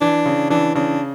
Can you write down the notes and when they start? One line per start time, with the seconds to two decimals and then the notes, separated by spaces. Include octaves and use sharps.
0.01 E3 D4
0.26 C#3
0.50 E3 D4
0.75 C#3 D4